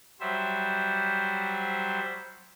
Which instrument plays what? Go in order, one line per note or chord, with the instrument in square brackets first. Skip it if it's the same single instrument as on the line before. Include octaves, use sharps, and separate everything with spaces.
[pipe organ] F#3 G3 C5 E5